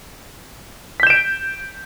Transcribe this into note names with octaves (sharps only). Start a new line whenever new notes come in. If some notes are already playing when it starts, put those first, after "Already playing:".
G6 B6 D7 E7